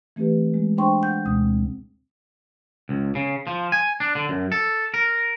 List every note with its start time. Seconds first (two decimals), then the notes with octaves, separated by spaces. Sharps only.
0.16 E3 A3 C4 G4 B4
0.54 G#3
0.77 D4 G#4 C5 G5 C6 C#6
1.02 F#5 G6
1.26 D2 B2 G#3 C4 D#6
2.89 C#2
3.15 C#3
3.47 F3
3.72 G#5
4.00 D4
4.15 D3
4.29 F#2
4.52 A4
4.94 A#4